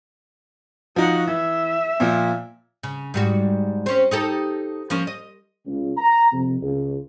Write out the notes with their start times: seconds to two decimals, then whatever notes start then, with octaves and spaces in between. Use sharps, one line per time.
0.96 F3 D#4 F#4 F#5
1.27 E3 E5
2.00 A#2 F3
2.83 C#3
3.14 G#2 G3 F#4
3.86 C4 C#4
4.11 D#4 G4 A4
4.90 F3 A#3 C#4
5.07 D#5
5.67 C#2
5.97 A#5
6.32 F2 C3
6.61 C#2